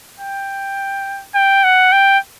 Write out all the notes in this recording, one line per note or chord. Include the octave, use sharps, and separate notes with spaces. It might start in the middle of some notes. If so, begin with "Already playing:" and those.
G5
G5
F#5
G5